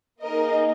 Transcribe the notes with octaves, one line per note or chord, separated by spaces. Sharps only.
A#3 D#4 G#4 A#4 D#5